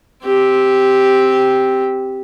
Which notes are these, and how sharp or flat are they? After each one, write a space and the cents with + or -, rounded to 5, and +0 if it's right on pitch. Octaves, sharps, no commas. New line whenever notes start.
C4 +0 G4 +0